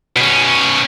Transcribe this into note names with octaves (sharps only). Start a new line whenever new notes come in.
B2 C#4